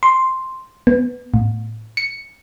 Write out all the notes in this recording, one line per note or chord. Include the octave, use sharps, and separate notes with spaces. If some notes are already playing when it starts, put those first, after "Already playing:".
C6
B3
A2
C#7